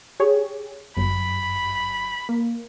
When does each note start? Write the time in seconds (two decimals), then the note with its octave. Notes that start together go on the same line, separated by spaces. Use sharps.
0.20 G4 G#4 C#5
0.97 G1 F#2 B5
2.29 A#3